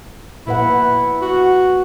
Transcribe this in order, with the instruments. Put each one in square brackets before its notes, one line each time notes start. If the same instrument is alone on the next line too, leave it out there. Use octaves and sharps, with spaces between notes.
[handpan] A#2 B4 F#5 [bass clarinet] E4
[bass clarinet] F#4